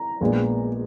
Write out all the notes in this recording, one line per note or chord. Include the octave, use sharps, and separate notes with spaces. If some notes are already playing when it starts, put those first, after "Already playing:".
Already playing: A#5
A#1 A#2 G#3 B3